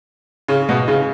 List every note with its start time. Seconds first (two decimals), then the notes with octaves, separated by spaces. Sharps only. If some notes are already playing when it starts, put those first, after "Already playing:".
0.48 C#3
0.69 B2
0.88 C#3